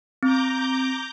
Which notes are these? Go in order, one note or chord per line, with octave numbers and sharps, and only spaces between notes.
C4 A#5 D6 G6